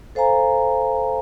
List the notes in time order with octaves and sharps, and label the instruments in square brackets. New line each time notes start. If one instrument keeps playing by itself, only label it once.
[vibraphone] A4 C5 F5 G#5 A#5